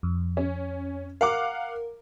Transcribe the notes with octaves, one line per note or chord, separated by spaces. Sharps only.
F2
C#4
A#4 F5 F#5 D6